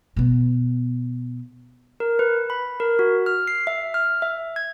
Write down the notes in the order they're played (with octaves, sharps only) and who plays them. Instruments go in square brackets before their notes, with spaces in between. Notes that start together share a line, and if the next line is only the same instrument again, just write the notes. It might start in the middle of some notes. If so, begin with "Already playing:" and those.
[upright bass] B2 B3
[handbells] A#4
B4
B5
A#4
F#4
F6
C7
E5
F6
E5
G#6